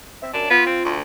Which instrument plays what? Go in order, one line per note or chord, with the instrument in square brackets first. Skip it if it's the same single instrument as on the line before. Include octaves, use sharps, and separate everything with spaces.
[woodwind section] C4 E5
[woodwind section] F#2 [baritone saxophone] D4
[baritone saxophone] B3 [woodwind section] F4
[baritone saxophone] C4
D2